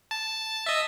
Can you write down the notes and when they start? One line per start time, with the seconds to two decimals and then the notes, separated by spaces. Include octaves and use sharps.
0.11 A5
0.66 D#5 E5